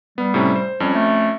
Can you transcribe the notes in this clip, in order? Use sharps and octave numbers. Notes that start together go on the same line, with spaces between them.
G3 B3
A2 C3 C#4
C5
F2 G3 C#4
A3